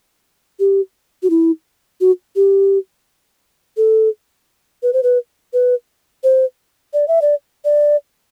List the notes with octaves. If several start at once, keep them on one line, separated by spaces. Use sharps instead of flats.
G4
F#4
E4
F#4
G4
A4
B4
C5
B4
B4
C5
D5
E5
D5
D5